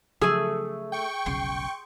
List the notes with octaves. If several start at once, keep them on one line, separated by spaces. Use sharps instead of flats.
C#3 F3 F#3 A3 G#4 E6
G5 C#6
F1 B1 C#3 C6